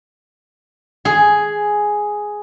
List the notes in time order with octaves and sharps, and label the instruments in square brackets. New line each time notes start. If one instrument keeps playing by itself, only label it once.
[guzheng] G#4